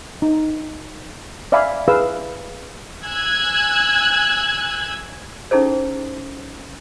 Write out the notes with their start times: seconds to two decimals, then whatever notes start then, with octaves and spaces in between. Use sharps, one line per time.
0.22 D#4
1.52 D5 E5 F5 G#5 B5
1.88 E4 G#4 B4 F5 E6
3.04 G#5 E6 F#6 G#6
5.51 C#4 D#4 E4 G#4 A4 C5